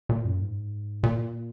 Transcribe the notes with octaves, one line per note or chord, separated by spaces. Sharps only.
A#2
F#2
G#2
A#2